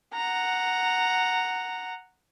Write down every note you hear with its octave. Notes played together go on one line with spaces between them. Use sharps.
F#5 A#5